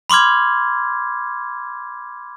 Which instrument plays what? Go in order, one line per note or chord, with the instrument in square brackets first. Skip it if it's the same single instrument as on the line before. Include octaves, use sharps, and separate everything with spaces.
[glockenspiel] B5 C6 D6 F6 G#6